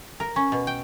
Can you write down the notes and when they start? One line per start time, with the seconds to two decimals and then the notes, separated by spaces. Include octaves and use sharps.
0.20 A#4
0.36 C#4
0.52 B2
0.67 G5